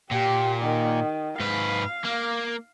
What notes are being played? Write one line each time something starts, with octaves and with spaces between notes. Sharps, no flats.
A#2 G4
D#3
G#2 B4 F5
A#3